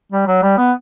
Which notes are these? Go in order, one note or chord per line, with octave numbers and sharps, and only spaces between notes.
G3
F#3
G3
B3